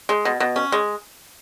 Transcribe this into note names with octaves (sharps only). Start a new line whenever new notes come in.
G#3
B2
B2
C#4
G#3